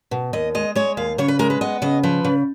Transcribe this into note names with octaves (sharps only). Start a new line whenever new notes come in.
B2
D#2 D#5
G#3 D#5
G#3 C#5
D#2 F5
C#3 C#5
B4
G#3 A#4
B4
B3 D#5
C#3 D#5
F3 B4
C#3